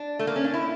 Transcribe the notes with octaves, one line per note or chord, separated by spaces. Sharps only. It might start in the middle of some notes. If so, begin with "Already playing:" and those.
Already playing: D4
A3
A#3
C#4
D4
E4